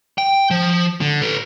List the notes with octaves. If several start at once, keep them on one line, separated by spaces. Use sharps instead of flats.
G5
F3
D3
A4 B4